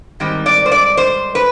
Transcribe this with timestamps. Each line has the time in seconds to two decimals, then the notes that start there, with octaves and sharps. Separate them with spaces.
0.20 G#2 D#3 G3 C4
0.46 D5
0.66 C5
0.71 D5
0.97 C5
1.35 B4